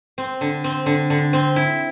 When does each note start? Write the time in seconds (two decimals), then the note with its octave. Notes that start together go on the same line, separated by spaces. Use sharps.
0.18 C4
0.41 D3
0.64 C4
0.86 D3
1.10 D3
1.33 C4
1.56 E4